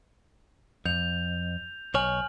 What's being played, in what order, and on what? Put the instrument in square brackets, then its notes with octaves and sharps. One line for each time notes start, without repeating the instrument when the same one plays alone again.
[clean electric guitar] F2 [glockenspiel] G6 F7
[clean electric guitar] B1 C#5 [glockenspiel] G#5 F6 F#7